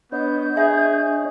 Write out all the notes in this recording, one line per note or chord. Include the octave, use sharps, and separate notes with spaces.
B3 D4 C#5 D#5 G6
G#4 E5